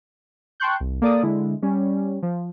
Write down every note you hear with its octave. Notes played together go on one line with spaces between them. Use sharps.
G5 A5 C6 C#6 F#6 G6
C2
A#3 A4 D5 D6 D#6
D3 G#3 E4
G3 C#4
F3